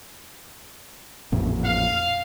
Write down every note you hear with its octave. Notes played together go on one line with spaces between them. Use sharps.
A1 F2 A#2
F5